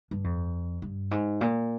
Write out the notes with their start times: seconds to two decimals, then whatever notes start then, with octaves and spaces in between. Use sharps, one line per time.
0.11 G2
0.24 F2
0.82 G2
1.11 G#2
1.41 A#2